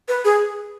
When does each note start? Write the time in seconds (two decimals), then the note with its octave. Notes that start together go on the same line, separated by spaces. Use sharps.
0.08 B4
0.25 G#4